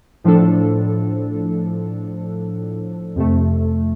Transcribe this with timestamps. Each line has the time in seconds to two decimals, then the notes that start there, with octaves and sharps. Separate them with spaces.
0.24 A2 F3 D4 A4
3.16 F2 C3 A3